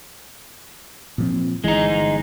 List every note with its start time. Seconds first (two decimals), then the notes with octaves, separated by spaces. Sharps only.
1.18 A#2 F3 C4
1.64 G1 E3 G#3 D#4